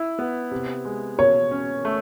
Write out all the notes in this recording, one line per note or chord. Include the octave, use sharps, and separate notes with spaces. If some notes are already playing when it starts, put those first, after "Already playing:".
Already playing: E4
B3
C3
G#3
B2 C#5
C#4
A3